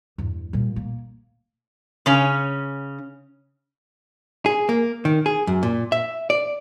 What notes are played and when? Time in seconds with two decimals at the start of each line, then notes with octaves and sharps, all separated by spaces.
0.18 E2 G2
0.53 A#2 G3
0.76 A#3
2.06 C#3 C#4
4.46 G#4
4.69 A#3
5.05 D#3
5.26 G#4
5.47 F#2
5.63 A#2
5.92 E5
6.30 D5